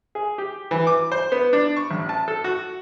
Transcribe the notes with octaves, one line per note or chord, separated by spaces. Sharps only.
G#4
G4
E3
D6
C5
B3
D4
C#6
A1
A5
A4
F#4